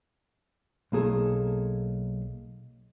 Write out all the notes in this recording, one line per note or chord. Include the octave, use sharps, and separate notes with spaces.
B1 A#3 G#4 A4